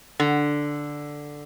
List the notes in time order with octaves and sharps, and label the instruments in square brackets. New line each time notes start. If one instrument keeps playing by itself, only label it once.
[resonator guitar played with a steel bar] D3